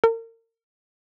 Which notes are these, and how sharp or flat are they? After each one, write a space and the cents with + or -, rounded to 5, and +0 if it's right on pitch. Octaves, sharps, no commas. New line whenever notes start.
A#4 -35